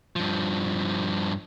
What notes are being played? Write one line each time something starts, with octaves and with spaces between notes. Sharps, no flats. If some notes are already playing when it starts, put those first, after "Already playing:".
G2 F3